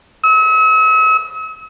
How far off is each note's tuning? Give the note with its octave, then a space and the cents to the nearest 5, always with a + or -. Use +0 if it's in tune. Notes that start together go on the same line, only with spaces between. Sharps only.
E6 -45